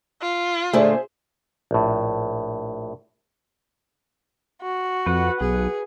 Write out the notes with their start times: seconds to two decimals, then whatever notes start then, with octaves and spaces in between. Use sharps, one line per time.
0.22 F4
0.73 A#2 D3 A3 G#4 C5 E5
1.71 A#1 A2
4.62 F#4
5.06 F2 B4 F#5
5.41 B1 G#4